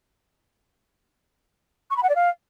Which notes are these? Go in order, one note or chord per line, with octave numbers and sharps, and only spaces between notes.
C#6
B5
F#5
D5
F5